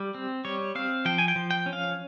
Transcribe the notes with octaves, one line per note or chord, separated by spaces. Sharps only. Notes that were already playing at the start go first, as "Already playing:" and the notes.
Already playing: G3
C4
G3 C#5
C4 F5
F3 G5
G#5
G5
F3
G5
C#4
F5